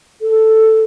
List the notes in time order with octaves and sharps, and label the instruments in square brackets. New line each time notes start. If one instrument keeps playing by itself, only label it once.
[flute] A4